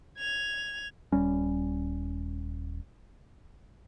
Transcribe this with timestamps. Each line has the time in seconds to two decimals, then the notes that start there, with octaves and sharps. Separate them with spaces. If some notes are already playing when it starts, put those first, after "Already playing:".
0.18 G#6 F7
1.12 D#1 G3 C#4